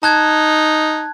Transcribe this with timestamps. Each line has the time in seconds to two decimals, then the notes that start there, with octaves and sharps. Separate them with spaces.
0.03 D#4 A5 F#6 G#6